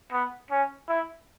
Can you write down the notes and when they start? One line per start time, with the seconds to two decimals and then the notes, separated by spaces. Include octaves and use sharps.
0.12 B3
0.51 C#4
0.88 E4